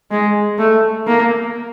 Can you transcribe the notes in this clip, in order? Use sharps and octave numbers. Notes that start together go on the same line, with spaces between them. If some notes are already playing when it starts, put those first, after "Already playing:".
G#3
A3
A#3